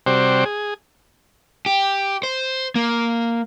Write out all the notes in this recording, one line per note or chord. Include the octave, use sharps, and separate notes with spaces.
C3 G3 C4 F#4 C5 D5
G#4
G4
C5
A#3